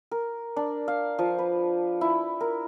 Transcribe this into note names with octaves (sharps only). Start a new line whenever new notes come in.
A#4
D4
F5
F3
B4
E4
A#4